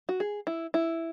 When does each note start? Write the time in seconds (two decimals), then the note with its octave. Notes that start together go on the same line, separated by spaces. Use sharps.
0.09 F#4
0.20 G#4
0.47 E4
0.74 E4